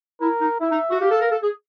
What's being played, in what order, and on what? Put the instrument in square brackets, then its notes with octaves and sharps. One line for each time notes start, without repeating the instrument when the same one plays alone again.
[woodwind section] E4 [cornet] A#4
[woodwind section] D#4
[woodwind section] E4 [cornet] E5
[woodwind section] D#4
F#4
[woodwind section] G4 [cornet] F5
[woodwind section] A4
A#4
A4
G#4